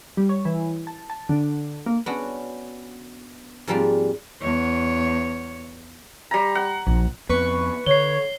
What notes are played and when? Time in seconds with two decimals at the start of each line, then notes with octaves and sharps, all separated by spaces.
0.17 G3
0.29 C#5
0.45 E3
0.87 A5
1.10 A5
1.29 D3
1.86 A#3
2.06 B3 C#4 D4 F#4
3.67 G#2 F3 G3 A#3 C4
4.42 E2 C#5
6.31 G3 A#5
6.55 F#5
6.87 A#1
7.29 F2 B3 C4 B4 C#6
7.86 D3 C#5 C7 G7